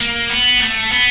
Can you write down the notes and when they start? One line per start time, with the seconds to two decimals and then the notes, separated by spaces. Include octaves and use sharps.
0.01 A#3
0.30 B3
0.60 A3
0.91 B3